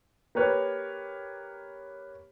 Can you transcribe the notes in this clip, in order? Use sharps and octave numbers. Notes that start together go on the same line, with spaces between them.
A#3 G4 A#4 B4 C#5